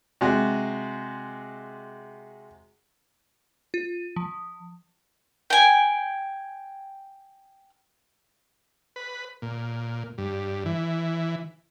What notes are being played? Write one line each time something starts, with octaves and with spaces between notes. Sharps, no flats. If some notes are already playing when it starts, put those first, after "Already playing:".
C3 G#3 F#4
F4
F3
G5 G#5
B4
A#2
G2
E3